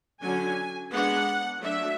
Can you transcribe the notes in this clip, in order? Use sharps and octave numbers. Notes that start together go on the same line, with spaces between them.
D3 F#3 C#4 G#5
G#3 B3 D4 F#5
F#3 A3 D4 E5